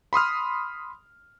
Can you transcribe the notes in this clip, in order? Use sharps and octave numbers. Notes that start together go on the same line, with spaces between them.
B5 C6 D#6 F6